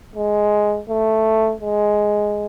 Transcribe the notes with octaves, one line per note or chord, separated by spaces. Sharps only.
G#3
A3
G#3